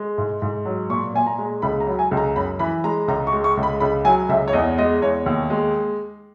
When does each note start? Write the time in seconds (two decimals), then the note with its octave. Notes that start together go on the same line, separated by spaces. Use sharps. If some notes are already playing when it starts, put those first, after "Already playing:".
Already playing: G#3
0.18 G#2
0.42 G#2
0.65 F#3
0.90 A#2 C#6
1.14 A#2 G#5
1.26 A#5
1.38 G#3
1.62 C#2 B5
1.80 A#5
1.87 F#3
1.99 G#5
2.11 C#2
2.17 A#5
2.36 F#2 B5
2.59 E3 B5
2.84 G#3 A#5
3.08 C#2 A#5
3.27 C#6
3.33 G#3
3.44 C#6
3.57 C#2
3.63 B5
3.80 C#2 B5
4.05 F#3 G#5
4.29 C#2 E5
4.48 C#5
4.53 E2 D#5
4.78 G#3 D#5
5.02 E2 C#5
5.26 D#2
5.50 G#3